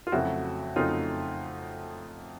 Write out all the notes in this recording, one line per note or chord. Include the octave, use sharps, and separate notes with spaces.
F4
F2 C#3 F#3 A3 E4 F#4
F2 C#3 F#3 A3 D#4 F4